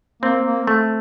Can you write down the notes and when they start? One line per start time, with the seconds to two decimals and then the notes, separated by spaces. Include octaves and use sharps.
0.23 A#3 C4
0.45 A#3
0.67 A3